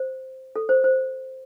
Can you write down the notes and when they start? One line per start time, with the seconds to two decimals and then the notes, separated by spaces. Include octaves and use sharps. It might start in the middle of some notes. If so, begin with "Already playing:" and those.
Already playing: C5
0.56 A4
0.69 C5
0.84 C5